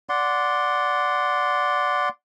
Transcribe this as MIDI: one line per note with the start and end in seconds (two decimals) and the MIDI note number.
0.09 2.09 74
0.09 2.09 78
0.09 2.09 84